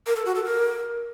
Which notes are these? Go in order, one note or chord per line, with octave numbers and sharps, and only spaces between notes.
A#4
A4
F#4
A4
A#4